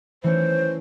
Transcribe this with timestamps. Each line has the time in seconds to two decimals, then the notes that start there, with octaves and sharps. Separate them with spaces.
0.24 E3 A3 C#4 C5